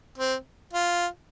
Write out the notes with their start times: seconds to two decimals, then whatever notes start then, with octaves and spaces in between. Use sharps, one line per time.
0.18 C4
0.73 F4